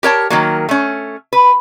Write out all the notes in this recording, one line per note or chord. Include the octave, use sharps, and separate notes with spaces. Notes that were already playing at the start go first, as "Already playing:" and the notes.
G4 A#4 C#5 A5
D#3 F#3 A#3
A3 C#4
B4